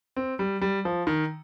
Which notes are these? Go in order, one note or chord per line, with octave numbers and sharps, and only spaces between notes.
C4
G3
G3
F3
D#3